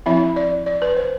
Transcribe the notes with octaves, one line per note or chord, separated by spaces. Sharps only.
F3 C4 E4 E5
D5
D5
B4
C5